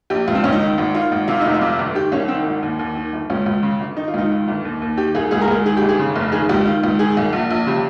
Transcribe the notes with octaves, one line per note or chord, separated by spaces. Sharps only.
A#1 G4
C#2 F4
C4
C#2 C#4
D#4
D#3
G#1
D#3 F4
G#1
C3 F4
F1 D#4
F4
C3
G1
D#3 G4
C2 C#4
D#3 C4
G#1
D#2
D#2
D#3
G1
C#2 C#4
C#2
C#3
G1
D#3 D#4
F4
C#2 D#4
D#3 F4
G1
D#2
D#2
D#3 G4
C2 G#4
C#2 G#4
A#4
C#2 G#4
D#3 G#4
G1 G4
G#4
C#3
F1
D#3 G#4
C#2 G4
D#3 F4
C#2
D#3 G#4
C2
A#1
A#1
C#3 G4